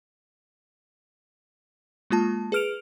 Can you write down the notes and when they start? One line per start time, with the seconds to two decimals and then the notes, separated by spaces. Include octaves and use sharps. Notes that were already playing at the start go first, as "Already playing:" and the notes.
2.10 G#3 A#3 F4 A5
2.52 G#4 B4 F6 D7 F7